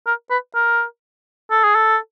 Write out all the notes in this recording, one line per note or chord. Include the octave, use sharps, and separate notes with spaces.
A#4
B4
A#4
A4
G#4
A4